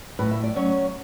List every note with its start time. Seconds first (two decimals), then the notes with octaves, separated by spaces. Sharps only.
0.19 A2 B4
0.31 E5
0.43 D5
0.56 F#3 C#4 C#5